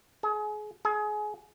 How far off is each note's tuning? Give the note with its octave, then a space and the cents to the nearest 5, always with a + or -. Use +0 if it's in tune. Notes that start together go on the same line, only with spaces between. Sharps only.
G#4 +30
G#4 +25